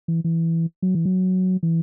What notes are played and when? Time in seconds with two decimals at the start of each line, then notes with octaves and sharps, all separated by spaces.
0.08 E3
0.24 E3
0.82 F#3
0.95 E3
1.05 F#3
1.63 E3